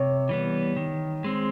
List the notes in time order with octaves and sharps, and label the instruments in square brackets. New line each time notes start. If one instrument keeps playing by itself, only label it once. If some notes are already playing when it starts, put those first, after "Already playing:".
Already playing: [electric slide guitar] C3 [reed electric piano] C#5
[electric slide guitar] E3 G3 B3
D#3
G#3 C4